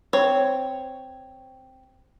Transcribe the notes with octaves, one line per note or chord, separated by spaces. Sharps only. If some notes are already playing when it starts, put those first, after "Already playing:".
C4 C#5